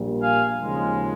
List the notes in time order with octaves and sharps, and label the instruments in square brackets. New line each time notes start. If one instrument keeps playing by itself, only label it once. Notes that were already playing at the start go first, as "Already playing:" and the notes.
Already playing: [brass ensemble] A#1 A#2 G3 A#3
F5 G#5
D#2 C#3 F3 G#3